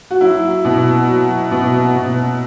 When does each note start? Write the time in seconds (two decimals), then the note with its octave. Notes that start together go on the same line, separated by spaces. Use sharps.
0.11 F#4
0.21 F#3 E4
0.65 B2
1.08 F#3
1.52 B2
1.96 B2